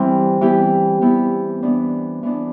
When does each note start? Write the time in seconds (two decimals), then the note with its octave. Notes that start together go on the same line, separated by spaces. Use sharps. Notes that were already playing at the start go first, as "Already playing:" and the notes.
Already playing: E3 G3 C4
0.41 E3 B3 E4 G4
1.01 E3 B3 E4 G4
1.63 E3 B3 D4
2.23 E3 B3 D4